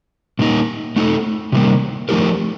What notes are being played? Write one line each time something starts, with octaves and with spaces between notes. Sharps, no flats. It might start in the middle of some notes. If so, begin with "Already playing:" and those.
A#2 G3 A#3 D#4
A3 D#4 A4
C3 D#3 G3 A#3
F3 A3 D#4 G4 A#4